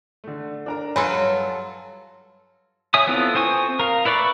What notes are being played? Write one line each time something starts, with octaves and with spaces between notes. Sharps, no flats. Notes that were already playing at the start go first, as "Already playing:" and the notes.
D3 A3
D4 A#4 A#5
F#3 F4 A4 B4 G#5 D#7
G2
C#5 E5 G#5 D#6
B3 C4 E4 F4 A4
C4 C5 G#5 C#6 D#6
A#4 F5
E4 B4 D5 B5 C#6